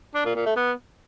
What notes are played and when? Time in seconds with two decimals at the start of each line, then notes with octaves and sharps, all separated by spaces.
0.15 D4
0.25 A#2
0.35 A#2
0.46 A3
0.56 B3